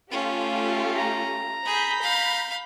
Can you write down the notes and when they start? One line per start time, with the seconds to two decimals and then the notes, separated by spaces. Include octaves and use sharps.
0.11 A3 C#4 F4 G4
0.97 A#5
1.65 G#4 B5 G6 B6
2.02 F5